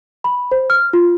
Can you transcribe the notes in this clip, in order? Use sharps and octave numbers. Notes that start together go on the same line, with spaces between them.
B5
C5
F6
F4